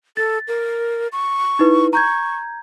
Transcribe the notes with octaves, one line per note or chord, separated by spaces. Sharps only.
A4 A6
A#4
C#6
D#4 E4 B4
A#5 C#6 G6 G#6